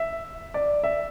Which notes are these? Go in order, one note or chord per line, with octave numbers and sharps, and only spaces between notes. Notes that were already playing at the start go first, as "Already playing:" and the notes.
Already playing: E5
D5
E5